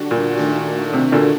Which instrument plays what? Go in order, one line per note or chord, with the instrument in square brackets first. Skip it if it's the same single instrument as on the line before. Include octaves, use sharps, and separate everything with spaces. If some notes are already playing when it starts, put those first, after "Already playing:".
Already playing: [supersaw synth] D3 G3 D4 F#4
[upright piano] A#2
[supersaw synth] D#3 A3 D4 F#4
[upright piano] C3
A#2 D3